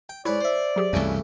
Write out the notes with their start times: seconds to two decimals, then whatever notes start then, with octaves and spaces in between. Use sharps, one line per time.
0.09 G5
0.25 G#2 E4 B4 C#5 D5
0.40 C5 E5
0.76 F#3 G4 G#4
0.93 C2 F#2 C#3 E3 A3